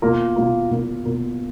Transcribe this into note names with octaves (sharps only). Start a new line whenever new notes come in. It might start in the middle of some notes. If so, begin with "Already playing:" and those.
B2 A#3 F4 A#4
B2 A#3 F4 A#4
B2 A#3 F4 A#4
B2 A#3 F4 A#4